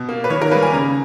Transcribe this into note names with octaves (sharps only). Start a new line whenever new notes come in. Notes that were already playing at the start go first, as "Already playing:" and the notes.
Already playing: B2
A#3
B4
D#3 C#5
A#4
G3 A#3 B4
G#5
C#3 A#5